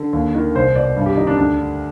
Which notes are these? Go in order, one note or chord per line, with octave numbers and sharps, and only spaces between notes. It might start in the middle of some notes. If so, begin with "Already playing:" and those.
Already playing: D3
D#2
D#3
C2 C5
B2 D5
G2
G4
D#3 D#4
D4
D2 D4
D3